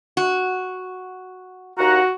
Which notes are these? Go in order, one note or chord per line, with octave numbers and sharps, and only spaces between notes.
F#4
D#2 F#4 F#5 A#5